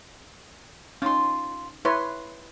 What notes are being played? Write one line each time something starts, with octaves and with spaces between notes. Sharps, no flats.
C#4 D#4 F4 C6
E4 B4 C#5 C6